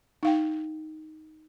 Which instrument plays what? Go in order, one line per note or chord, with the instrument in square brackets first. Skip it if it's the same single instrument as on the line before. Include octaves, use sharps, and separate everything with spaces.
[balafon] D#4 F5 G5